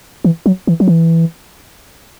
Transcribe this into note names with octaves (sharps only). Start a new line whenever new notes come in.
E3
F#3
E3
F#3
E3